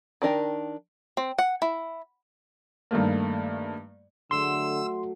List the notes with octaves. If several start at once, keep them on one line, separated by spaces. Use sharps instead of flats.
D#3 D4 A#4 G5
C4
F#5
E4
G2 D#3 A3 A#3
D3 F#3 A3 C6 E6